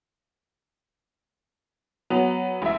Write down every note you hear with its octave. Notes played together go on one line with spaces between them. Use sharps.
F#3 B3 F7
A1 E5